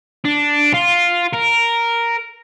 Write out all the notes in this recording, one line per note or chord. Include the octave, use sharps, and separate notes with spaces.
D4
F4
A#4